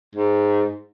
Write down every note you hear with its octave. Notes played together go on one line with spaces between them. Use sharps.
G#2